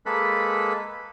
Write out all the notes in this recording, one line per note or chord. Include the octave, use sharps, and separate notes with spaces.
G#3 A#3 A4 B4 B5